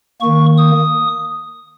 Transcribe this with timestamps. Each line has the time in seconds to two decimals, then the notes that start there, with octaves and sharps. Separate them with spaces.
0.21 D#3 A#3 C#6
0.58 D#6